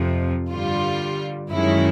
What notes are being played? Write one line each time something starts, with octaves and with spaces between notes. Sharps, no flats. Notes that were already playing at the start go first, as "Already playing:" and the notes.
Already playing: F2 C3 F3
G2 D3 G3 F4
F#2 D#3 G#3 C#4 E4